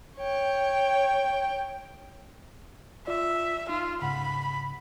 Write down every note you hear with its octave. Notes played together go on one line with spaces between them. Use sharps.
C#5 G5
F4 D5 E5
D#4 F4
G#2 C#3 F#5 B5